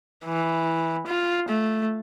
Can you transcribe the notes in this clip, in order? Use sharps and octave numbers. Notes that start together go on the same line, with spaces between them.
E3
F4
A3